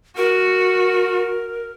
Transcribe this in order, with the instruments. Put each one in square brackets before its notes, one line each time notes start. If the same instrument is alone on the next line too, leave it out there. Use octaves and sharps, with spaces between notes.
[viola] F#4 [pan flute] A#4